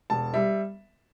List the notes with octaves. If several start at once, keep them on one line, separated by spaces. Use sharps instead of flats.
E1 A5
G3 E5